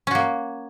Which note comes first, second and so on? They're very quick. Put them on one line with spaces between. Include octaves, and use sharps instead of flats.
C#4 F#4 A#3